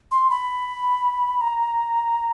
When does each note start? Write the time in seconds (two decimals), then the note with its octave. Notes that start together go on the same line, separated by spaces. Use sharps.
0.11 C6
0.30 B5
1.41 A#5